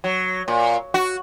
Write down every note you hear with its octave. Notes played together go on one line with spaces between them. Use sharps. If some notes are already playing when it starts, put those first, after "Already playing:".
F#3
A#2
F#4